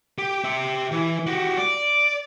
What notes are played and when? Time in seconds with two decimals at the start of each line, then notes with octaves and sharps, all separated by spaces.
0.18 G4
0.44 G4 E5
0.92 E3
1.27 F#4 G4
1.57 D5